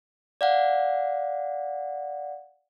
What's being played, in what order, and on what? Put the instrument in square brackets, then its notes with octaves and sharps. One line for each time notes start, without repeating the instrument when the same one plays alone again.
[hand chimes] D5 F5 F#5